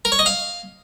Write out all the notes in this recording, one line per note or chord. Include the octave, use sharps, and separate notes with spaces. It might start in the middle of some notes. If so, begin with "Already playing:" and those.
A#4
C#5
D#5
F5